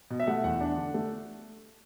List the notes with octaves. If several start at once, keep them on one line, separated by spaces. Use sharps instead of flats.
B2
E5
A3 F#5
E2 F#5
D4
D3
A3